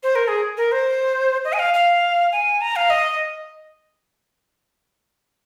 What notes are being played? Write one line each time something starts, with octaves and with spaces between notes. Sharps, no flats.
C5
A#4
G#4
A#4
C5
D#5
G#5
F5
F5
G#5
A#5
F5
D#5